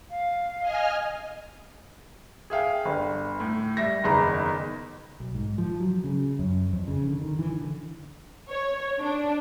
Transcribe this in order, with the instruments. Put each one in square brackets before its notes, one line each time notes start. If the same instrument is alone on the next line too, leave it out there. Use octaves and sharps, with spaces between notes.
[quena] F5
[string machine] D#5 G#5 F6
[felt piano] G#4 E5 F5 G5
G1
A2
G3 E5 A#6
F#1 E2 D#3 A#5 B5
[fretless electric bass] B1
G#2
F3
F#3
C#3
F#2
F2
C#3
D3
D#3
E3
D3
[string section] C#5
D4